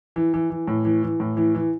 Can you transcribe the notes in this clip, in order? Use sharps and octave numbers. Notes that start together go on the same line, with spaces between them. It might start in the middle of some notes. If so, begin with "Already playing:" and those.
E3
E3
E3
A2
E3
E3
A2
E3
E3